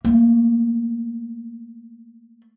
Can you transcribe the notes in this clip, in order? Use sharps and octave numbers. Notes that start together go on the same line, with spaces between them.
A3 A#3